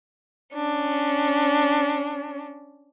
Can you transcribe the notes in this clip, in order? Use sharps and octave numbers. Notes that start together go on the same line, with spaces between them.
C#4 D4